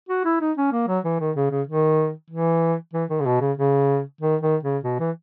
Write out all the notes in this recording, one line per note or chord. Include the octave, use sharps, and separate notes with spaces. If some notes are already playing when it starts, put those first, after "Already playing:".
F#4
E4
D#4
C#4
A#3
F#3
E3
D#3
C#3
C#3
D#3
E3
E3
D#3
C#3
B2
C#3
C#3
D#3
D#3
C#3
B2
E3